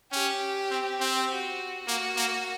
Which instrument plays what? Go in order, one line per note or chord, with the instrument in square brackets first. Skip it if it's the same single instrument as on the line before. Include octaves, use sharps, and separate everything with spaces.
[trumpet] C#4 [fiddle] G4
[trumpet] C4
C4
[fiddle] F#4
[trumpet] A#3 [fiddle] F#4
[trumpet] A#3